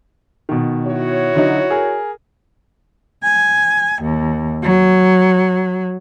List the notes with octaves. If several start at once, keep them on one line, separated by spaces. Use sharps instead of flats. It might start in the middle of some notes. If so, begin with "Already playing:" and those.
B2 D#3
E4 F#4 C#5
D3 F#3 D#4
G#4 A#4
G#5
D#2
F#3